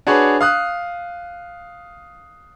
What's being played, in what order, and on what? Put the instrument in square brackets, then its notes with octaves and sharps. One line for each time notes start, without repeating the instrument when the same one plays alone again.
[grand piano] D4 F#4 G#4 B4 C#5
F5 D#6 F#6